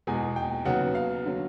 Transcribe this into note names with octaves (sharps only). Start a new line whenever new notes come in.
E2 B2 G#3 G#5
G5
D#2 C#3 F#3 B3 F#5
F5
D3 F#3